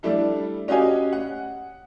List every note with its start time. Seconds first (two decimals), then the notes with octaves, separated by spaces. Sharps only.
0.03 G3 A3 D4 E4 A4
0.68 C#4 F#4 G4 D#5 F5 G#5
1.13 F#5